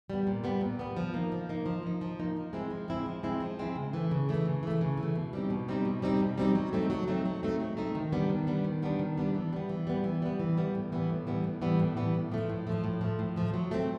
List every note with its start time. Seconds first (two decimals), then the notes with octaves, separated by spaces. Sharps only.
0.10 G3 B3
0.27 A#2
0.44 G3 B3
0.61 A#2
0.79 G3 B3
0.97 F3
1.14 A#3 D#4
1.32 F3
1.49 A#3 D#4
1.66 F3
1.83 A#3 D#4
2.01 F3
2.19 A#3 D#4
2.37 F3
2.53 G#3 C4 E4
2.70 F3
2.88 G#3 C4 E4
3.06 F3
3.23 G#3 C4 E4
3.40 F3
3.59 G#3 C4 E4
3.75 C#3
3.93 E3 A3
4.11 C#3
4.29 E3 A3
4.46 C#3
4.63 E3 A3
4.81 C#3
4.97 E3
5.03 A3
5.16 B2
5.33 G3 C4 D#4
5.50 B2
5.68 G3 C4 D#4
5.85 B2
6.02 G3 C4 D#4
6.21 B2
6.38 G3 C4 D#4
6.55 F#3
6.73 A3 C4 D#4
6.90 F#3
7.08 A3 C4 D#4
7.26 F#3
7.43 A3 C4 D#4
7.60 F#3
7.77 A3 C4 D#4
7.95 D#3
8.12 G3 B3 D4
8.30 D#3
8.47 G3 B3 D4
8.64 D#3
8.82 G3 B3 D4
8.99 D#3
9.17 G3 B3 D4
9.35 E3
9.53 G3 B3
9.69 E3
9.87 G3 B3
10.04 E3
10.22 G3 B3
10.39 E3
10.57 G3 B3
10.75 A2
10.92 E3 G3 B3
11.10 A2
11.27 E3 G3 B3
11.44 A2
11.62 E3 G3 B3
11.79 A2
11.97 E3 G3 B3
12.14 A2
12.32 F3 A3
12.50 A2
12.67 F3 A3
12.84 A2
13.01 F3 A3
13.19 A2
13.36 F3 A3
13.54 F#3
13.71 A3 C4